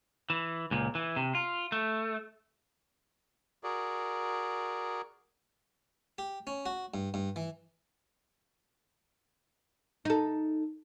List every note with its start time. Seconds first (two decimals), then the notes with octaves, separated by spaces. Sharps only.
0.30 E3
0.71 C#2 A#2
0.95 E3
1.16 C3
1.35 F4
1.72 A3
3.64 F#4 G#4 A#4 D5
6.18 G4
6.47 C#4
6.66 F#4
6.94 G2
7.14 G2
7.36 E3
10.05 D#4 A4